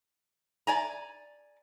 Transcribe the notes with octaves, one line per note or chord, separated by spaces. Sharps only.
D5 G#5 A#5